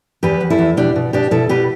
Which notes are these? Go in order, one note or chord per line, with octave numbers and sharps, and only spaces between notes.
E2 G4 B4
E2
E4 A4
E2
B2 D4 G4
B2
B2 D4 G4
B2 E4 A4
B2 G4 B4